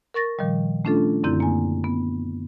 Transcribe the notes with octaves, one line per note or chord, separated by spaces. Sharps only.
A#4 C#6 A6 A#6
A#2 D#3 F3 G3
A3 C#4 D4 F4 A4
F#2 D3 C4 E4 G6
A#3 G#5
B3